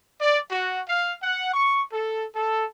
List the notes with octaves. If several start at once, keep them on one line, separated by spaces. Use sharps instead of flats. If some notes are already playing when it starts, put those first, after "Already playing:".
D5
F#4
F5
F#5
C#6
A4
A4